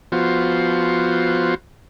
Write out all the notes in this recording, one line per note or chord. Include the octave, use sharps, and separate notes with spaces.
F3 B3 F4 F#4 C5